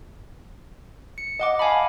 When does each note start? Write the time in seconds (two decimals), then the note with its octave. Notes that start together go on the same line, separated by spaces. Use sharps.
1.18 C#7
1.39 D#5 F#5 D6
1.59 F5 G#5 A5 B5